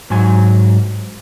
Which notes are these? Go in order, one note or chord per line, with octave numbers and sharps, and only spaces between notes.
G#2 F#3 G#5